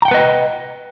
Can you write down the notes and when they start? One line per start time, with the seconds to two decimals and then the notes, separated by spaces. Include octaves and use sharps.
0.02 A#5
0.05 G5
0.08 F#5
0.11 B4
0.14 D#5